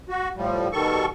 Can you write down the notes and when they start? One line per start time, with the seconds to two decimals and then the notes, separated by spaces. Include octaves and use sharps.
0.09 F#4
0.37 A2 F3 G3
0.72 B2 D#3 G3 A4 C#6